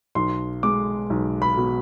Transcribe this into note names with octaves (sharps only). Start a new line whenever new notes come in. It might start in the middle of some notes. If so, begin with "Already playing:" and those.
B1 C6
G#3 D6
B1
B5
B2